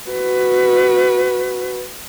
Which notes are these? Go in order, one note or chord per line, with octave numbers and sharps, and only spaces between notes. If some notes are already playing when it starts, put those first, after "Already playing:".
F#4 B4